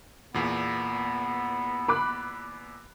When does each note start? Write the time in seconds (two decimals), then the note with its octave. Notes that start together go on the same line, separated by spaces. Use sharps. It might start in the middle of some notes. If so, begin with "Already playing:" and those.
0.34 E2 A#2 B3
1.88 B5 D6 F#6